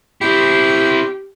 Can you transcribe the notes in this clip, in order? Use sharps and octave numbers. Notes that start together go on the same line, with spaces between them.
C4 E4 G4